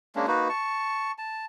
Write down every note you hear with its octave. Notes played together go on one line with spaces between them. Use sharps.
G#3 A#3 C#4 D4
A#3 D#4 F#4 B4
A5 C#6
A5